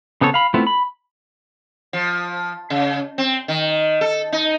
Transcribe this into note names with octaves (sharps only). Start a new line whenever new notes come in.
C#3 B3 C4 A4 C#5
F5 B5
A3 B3 C4 E4 F4
B5
F3
C#3
C4
D#3
A4
D#4